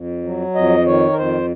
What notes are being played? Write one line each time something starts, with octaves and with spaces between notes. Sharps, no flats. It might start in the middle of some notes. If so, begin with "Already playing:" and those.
Already playing: F2
F#3
F2 D#5
D#3 C#5
A#4
F2 C5